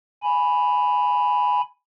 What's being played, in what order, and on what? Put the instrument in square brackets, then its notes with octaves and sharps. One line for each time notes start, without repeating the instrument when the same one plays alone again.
[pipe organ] G#5 B5